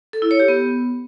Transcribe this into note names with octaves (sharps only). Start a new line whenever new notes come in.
A4
E4
C#5
G4
B3